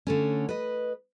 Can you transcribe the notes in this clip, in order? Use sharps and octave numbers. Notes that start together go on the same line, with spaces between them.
D3 A3 C#4
B4 D#5